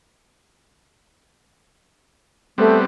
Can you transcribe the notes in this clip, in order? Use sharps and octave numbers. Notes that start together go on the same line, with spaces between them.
G3 A3 B3 C4